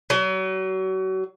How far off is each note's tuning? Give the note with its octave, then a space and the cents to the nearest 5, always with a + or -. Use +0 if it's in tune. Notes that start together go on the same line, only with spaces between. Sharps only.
F#3 +35